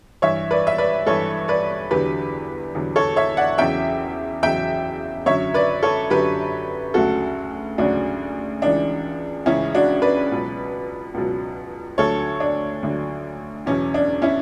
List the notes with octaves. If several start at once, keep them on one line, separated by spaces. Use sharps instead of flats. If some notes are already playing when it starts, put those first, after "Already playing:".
G2 E3 C#5 E5
B4 D5
E5
B4 D5
G2 E3 A4 C#5
B4 D5
E2 D3 F#3 G4 B4
E2 D3 F#3
A4 C#5
C#5 E5
D5 F#5
E2 C#3 F#3 E5 G5
E2 C#3 F#3 E5 G5
F#2 D3 F#3 C#5 E5
B4 D5
A4 C#5
F#2 D3 F#3 G4 B4
D2 C#3 F#3 F#4 A4
D2 C#3 F#3 D4 F#4
C#2 C#3 E3 D4
C#2 C#3 E3 C#4 E4
D4 F#4
B4 D5
C#2 B2 F#3
C#2 B2 F#3
D2 D3 F#3 A4 C#5
D4
D2 D3 F#3
E2 B2 F#3 C#4
D4
C#4 E4